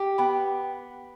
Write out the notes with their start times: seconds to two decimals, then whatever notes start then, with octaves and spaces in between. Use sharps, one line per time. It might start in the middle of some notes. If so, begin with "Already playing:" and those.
Already playing: G4
0.18 B3 G5 B5